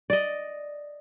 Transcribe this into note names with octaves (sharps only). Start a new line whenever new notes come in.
D5 D#5